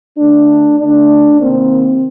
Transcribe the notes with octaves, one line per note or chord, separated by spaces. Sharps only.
D3 A3 D4
D3 A3 D4
C3 D#3 A#3 C4